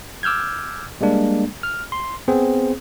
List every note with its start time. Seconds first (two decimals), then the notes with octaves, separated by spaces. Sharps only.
0.23 D6 E6 F6 G6 G#6
1.01 G3 G#3 A#3 D4
1.63 F6
1.92 C6
2.28 B3 C4 G#4 C5